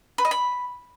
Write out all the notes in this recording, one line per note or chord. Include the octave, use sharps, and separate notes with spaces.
B4
D#5
B5